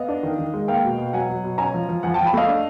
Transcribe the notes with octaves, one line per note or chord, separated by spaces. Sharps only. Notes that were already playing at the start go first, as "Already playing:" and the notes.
Already playing: B3 D#5 F5
D4
D#3
D#3
G#3
A#3 F5 G5
B2
B2
F#3 F#5 G#5
F#3
B2
C#4 G#5 A#5
F3
F3
F3 F#5 G#5
F3 G5 A5
A5 B5
A3 D#5 F5
D4